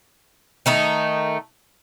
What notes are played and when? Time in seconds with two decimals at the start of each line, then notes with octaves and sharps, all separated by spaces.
0.66 D#3 A3 D#4